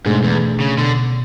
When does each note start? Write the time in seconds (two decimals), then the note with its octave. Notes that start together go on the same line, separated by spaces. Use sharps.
0.06 G#2 B2 A3 D4 G#4
0.24 E2
0.60 C#3
0.78 B2 D3